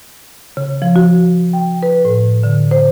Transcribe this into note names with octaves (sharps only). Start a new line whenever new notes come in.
C#3
F3
F#4
G5
B4
A2
D3
C5